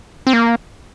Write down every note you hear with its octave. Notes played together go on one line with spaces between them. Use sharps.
C4
A#3